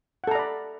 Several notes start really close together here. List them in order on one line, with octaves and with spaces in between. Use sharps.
F#5 A4 A#5 D5 B5